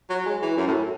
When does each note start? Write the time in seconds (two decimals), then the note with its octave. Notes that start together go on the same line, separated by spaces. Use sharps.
0.10 F#3
0.26 G#3
0.42 E3
0.57 F#2
0.67 A2